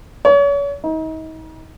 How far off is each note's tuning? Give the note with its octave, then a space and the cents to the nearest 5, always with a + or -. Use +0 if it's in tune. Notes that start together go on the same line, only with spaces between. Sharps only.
C#5 +35
D#4 +35